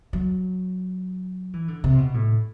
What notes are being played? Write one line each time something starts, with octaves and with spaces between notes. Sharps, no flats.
F#3
E3
D3
C3
B2
A2